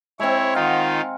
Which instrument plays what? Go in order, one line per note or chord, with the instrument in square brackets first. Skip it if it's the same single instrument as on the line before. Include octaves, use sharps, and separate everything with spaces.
[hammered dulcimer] G#3 C4 [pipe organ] E4 C#5
[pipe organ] D#3 D#4 F4 [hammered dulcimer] F5 F#5 A#5